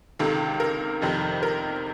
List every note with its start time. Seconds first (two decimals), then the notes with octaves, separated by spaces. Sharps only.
0.19 C#2 C3 D#3 A4
0.60 A#4
1.02 F1 F2 C3 D#3
1.43 A#4